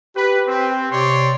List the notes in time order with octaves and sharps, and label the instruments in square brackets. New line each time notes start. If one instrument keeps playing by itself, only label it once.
[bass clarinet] G4 [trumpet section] B4
[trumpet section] C4
[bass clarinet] C3 [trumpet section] C#5 D5 C6